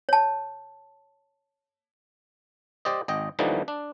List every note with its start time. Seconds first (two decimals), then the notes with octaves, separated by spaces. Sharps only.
0.09 C#5 A5
2.85 G4 C5 D5 D#5
3.08 G#1 D#5 G5
3.39 D#2 D3 E3 F3 G3 D#4
3.68 D4